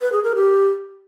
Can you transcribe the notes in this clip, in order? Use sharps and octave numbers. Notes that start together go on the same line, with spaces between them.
B4
G#4
A#4
G4